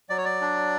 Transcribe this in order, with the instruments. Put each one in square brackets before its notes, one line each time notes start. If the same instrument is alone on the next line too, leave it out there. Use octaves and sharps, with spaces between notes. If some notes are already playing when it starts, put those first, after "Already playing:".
[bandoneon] F#3 D5
C#5
D5
D4